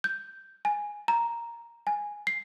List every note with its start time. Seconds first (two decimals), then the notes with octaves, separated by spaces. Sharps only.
0.04 G6
0.65 G#5
1.08 A#5
1.87 G#5
2.27 C7